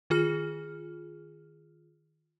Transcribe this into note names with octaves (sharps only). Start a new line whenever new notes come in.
D#3 F4 G#4 F6